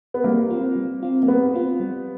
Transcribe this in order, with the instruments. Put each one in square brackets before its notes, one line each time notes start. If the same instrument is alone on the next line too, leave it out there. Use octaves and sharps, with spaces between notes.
[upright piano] B3
[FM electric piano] G3 [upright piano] A#3
[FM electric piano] C4 F4
G3
C4 F4
[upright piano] A#3
[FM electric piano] G3 [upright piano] B3
[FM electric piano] C4 F4
G3